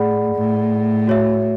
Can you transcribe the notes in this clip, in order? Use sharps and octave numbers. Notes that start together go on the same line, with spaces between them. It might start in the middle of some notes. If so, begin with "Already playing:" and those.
Already playing: A2 G#4 D5 F#5 B5
A2
F#4 C#5 E5